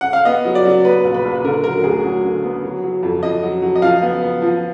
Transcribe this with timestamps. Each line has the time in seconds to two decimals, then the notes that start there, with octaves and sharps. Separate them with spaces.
0.01 F#5
0.13 F5
0.25 B3 D#5
0.45 F#3
0.55 D5
0.65 F#3
0.85 B3 B4
1.04 A#1
1.14 B4
1.25 A#1
1.35 B4
1.44 D3 A#4
1.64 F#3 A#4
1.84 D2 G#4
2.04 F#3
2.24 D3
2.43 B3
2.63 F#3
2.83 F#3
3.03 F2
3.23 F2 D#5
3.42 F#3
3.62 F#3
3.76 D#5
3.82 F3 F5
4.02 B3
4.22 B3
4.42 F3